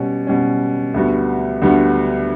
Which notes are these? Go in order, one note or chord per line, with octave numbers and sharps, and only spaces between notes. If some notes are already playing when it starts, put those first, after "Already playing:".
Already playing: B2 G3 C#4
B2 G3 C#4
D2 D3 G3 B3 F#4
D2 D3 G3 B3 F#4